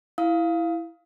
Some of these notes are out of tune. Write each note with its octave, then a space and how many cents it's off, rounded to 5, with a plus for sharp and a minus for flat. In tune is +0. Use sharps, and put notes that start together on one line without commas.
E4 +0 F5 +0 D#6 +30